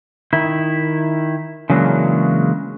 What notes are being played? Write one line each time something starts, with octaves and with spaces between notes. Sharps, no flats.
D#3 E4
C#3 E3 F#3 G#3 A#3 D4